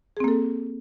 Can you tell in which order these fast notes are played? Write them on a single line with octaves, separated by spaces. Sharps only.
G#4 C4 A#3 A4